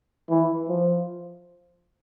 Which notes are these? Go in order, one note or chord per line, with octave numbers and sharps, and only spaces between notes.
E3
F3